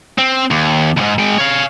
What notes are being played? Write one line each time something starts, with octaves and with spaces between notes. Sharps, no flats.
C4
D#2
D#2 G#2
G#3 G5
C#5 F5